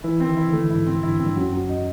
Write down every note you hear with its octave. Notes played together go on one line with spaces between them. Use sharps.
E3 E4
C4
D#3
E4
D3
A3
G#2 E4
C4
G2 E4
C4
G2
F#2 F#3
F#3
D#4